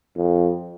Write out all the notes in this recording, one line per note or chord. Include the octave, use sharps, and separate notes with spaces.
F2